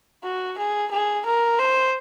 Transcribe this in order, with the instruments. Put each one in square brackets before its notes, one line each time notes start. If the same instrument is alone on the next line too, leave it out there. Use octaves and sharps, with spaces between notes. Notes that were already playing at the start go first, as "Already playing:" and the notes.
[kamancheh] F#4
G#4
G#4
A#4
C5